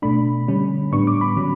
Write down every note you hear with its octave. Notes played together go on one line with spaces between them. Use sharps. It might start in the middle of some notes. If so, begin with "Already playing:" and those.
B2 A3 D4 B5
D3 G3 C#4
A2 G3 B3 D4 C#6
D6
B5
D3 F#3 C#4